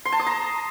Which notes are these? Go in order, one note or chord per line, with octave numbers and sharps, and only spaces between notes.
C6
A5
D#6
A#5